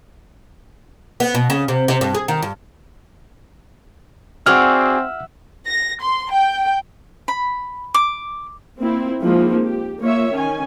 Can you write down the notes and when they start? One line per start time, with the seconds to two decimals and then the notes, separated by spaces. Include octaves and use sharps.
1.20 B3
1.35 B2
1.50 C#3
1.68 C3
1.88 C3
2.01 G2
2.15 G#4
2.28 D#3
2.43 G2
4.46 C4 F#4 G#4 D5 E5 F#5 F6
5.67 A#6
5.99 C6
6.35 G5
7.28 B5
7.94 D6
8.78 A#3 C4 E4
9.22 F3 G#3 A#3 C4 D#4 E4
9.62 G4
10.00 A#3 F4 C#5 E5
10.33 D#3 C#4 G#5